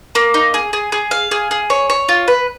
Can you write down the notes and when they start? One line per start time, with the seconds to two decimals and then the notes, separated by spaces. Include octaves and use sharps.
0.15 A#3
0.34 D#4
0.54 G#4
0.73 G#4
0.92 G#4
1.11 F5
1.31 G#4
1.51 G#4
1.70 C#5
1.90 C#5
2.09 F4
2.28 B4